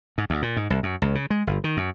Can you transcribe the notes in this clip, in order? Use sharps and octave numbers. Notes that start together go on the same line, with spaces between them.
G#2
D2
A#2
G#2
C2
F#2
C#2
C#3
G#3
G1
D#3
F#2